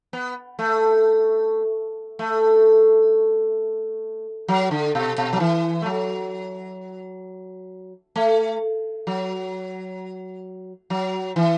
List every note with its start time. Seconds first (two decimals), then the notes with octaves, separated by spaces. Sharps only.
0.13 B3
0.59 A3
2.19 A3
4.48 F#3
4.71 D3
4.95 B2
5.18 B2
5.33 F#3
5.40 E3
5.82 A3
5.86 F#3
8.16 A3
9.07 F#3
10.90 F#3
11.36 E3